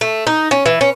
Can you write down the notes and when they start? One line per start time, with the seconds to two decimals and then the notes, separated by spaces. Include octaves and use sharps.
0.01 A3
0.27 D#4
0.51 C#4
0.66 E3
0.81 C#4